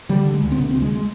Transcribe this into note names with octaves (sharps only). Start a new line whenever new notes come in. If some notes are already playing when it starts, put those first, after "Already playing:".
D3 G3
D3
G#3
D2
C4
C3 B3
D2 C4
G#3
G#3